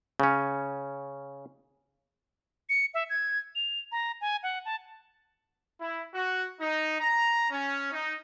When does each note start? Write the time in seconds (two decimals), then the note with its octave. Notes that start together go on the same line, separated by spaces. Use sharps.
0.20 C#3 C#4
2.69 C#7
2.94 E5
3.10 G#6
3.56 F7
3.92 A#5
4.21 G#5
4.43 F#5
4.65 A5
5.81 E4
6.14 F#4
6.61 D#4
7.01 A#5
7.51 C#4
7.92 D#4